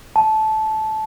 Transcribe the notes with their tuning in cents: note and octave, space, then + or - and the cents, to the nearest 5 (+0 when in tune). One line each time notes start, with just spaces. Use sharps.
A5 -15